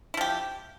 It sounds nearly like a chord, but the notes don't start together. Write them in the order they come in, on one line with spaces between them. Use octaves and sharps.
E4 F3 G4